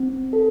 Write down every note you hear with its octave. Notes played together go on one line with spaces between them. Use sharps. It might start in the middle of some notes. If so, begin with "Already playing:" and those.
Already playing: C4
A4